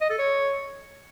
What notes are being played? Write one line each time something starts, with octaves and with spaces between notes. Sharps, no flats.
D#5
A4
C#5